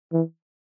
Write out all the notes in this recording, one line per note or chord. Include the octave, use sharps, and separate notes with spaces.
E3